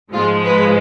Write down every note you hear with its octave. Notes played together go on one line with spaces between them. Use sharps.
G#2 F3 G#3 F4
B4